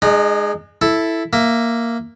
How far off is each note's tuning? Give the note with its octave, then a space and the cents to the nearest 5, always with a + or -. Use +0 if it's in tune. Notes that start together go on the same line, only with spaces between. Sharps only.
G#3 +0 D#4 -45
E4 +0 A4 +0
A#3 +0 E5 +15